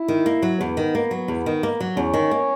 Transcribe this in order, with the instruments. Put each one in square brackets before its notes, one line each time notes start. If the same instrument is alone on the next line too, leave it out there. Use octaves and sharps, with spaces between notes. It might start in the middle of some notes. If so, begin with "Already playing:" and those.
Already playing: [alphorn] E4
[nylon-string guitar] D#3
A#3
F#3
[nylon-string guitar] E2 [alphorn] B3
[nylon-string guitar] D#3
A#3
F#3
E2
D#3
A#3
F#3
[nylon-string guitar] E2 [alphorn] C#4
[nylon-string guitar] D#3
A#3